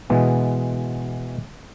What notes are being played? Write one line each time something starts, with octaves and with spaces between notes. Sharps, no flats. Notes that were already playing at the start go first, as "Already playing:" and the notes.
B2 E3 G#3 B3